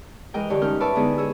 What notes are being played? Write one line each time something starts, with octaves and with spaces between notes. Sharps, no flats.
E3 G#3 A#4 D#5 G5
G2 D3 E3 G4 C#5
C#4 D#4 A#4 F6 G6
G4 B4 C#5 D5 E5 A5
D3 G#3 B3 D#4 E4 G#4
G#4 C#5 E6